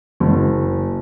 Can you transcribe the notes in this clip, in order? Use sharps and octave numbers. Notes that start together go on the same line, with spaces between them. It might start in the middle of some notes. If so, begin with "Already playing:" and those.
F#1